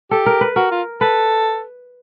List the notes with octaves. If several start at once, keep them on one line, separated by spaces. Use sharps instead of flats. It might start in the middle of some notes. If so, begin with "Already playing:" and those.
G4 A4
A#4
B4
F#4 A#4
F4
A4 B4